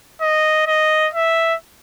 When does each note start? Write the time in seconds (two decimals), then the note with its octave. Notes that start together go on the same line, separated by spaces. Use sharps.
0.21 D#5
0.67 D#5
1.13 E5